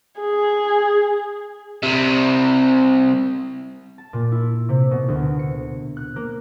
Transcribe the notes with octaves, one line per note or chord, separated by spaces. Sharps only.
G#4
C2 C3
A5
A#2
E4
C3
B2
D2
C#7
F#6
A#3